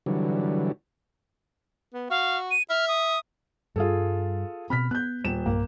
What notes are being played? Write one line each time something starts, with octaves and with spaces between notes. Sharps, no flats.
D3 E3 F#3 G3
B3
F#4 F5
D#7
E5 F6
D#6
G2 G3 F4 G#4 A4
B2 C4 B5 F6 B6
B3 F#6 G6
D#1 E7
B1 G2 A#3